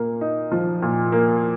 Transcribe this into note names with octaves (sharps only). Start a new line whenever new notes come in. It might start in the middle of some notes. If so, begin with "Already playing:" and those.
Already playing: A#2 A#3
D#4
F3
A#2
A#3